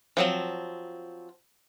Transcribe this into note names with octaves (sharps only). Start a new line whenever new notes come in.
F3 F#3 C4